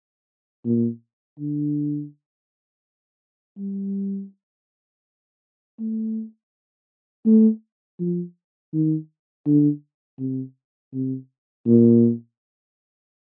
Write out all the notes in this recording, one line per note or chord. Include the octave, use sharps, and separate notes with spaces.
A#2
D3
G3
A3
A3
F3
D#3
D3
C3
C3
A#2